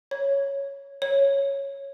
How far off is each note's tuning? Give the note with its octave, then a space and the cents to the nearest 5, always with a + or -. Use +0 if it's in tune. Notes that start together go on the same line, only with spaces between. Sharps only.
C#5 +0
C#5 -5